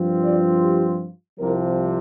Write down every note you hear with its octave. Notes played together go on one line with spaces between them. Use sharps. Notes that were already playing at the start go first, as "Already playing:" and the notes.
Already playing: G2 F3 C4 F4
D5
G4
C2 C3 F3 A#4